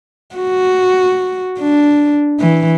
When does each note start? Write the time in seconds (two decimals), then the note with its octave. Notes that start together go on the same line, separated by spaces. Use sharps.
0.36 F#4
1.58 D4
2.40 E3